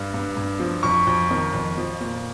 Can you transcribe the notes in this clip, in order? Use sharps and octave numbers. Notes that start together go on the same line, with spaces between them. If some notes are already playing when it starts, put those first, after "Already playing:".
Already playing: G2
G2
G2
F3
F2 C#6
F2
D#3
F2
F3
A#2